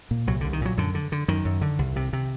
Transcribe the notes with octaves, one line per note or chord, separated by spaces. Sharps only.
A#2
C2 F#3
C2 D3
D#3
A#2 F#3
F#2 D3
D3
D3
F#2 D#3
F#2
D3
C2
C3
C3